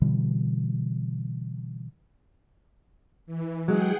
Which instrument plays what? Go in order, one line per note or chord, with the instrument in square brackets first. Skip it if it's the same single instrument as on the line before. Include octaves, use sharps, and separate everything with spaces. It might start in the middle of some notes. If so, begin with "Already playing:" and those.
[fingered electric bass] B2 D3 E3 G3
[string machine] E3
[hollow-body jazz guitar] F#3 G#3 [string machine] G#4 F#5 G5